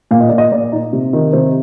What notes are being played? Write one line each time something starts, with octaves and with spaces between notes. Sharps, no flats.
A#2 F5
D#5
A#2 D5
D#5
A#2 D5
D#4
C3
D#3
C3 C5